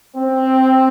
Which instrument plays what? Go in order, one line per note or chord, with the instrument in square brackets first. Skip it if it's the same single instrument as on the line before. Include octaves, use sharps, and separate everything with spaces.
[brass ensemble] C4